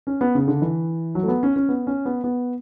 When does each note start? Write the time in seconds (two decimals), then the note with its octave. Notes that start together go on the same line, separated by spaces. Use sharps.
0.07 C#4
0.21 B3
0.35 C#3
0.48 D3
0.62 E3
1.15 F#3
1.23 A3
1.28 B3
1.43 C#4
1.56 C#4
1.69 B3
1.87 C#4
2.06 B3
2.24 B3